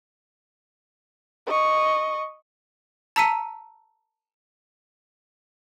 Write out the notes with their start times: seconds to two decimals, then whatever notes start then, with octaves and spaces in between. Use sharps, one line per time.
1.47 D#5 C#6
3.16 A5 A#5 E6 B6 C#7 D#7